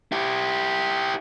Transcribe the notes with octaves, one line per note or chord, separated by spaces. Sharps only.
E4 G4